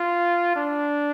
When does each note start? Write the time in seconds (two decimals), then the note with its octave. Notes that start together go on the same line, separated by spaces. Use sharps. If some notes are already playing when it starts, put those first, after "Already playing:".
Already playing: F4
0.56 D4